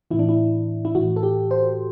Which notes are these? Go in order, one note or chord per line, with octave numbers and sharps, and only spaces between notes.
A2 E3 E4
D4
E4
E4
A2 E3 F#4
A4
G4
C5